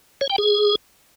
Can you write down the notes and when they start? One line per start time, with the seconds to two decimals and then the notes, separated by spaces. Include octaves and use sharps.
0.21 C#5
0.30 G5
0.38 G#4